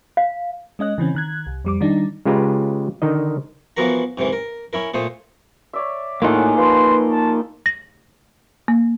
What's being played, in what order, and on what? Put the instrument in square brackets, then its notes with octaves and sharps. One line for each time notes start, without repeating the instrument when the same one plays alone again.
[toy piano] F5
[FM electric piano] G#3 C#4 D#5 F#6
C#3 E3 C4 C#4
D#3 F#6 G#6
C2
F2 G3 D6
D#3 G3 D4 D#4
[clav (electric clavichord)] C#3 G#3 F4 G4 B4 A#5
D3 D#3 D#4 D#5
[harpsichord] E3 F3 B3 F#4 A#4 A#5
G#2 C3 D#3 E3
A#4
C#4 E4 A#4
A#2 A3 C5 D#6
[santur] C#5 D5 E5
[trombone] A2 [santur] A3 F4 G#4 [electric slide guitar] A#3 D#4 [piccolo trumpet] F#5
[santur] F3 [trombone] B4 [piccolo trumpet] C6
[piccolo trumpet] A5
[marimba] A#6
A#3